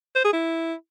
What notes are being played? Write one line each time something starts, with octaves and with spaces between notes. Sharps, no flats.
C5
G#4
E4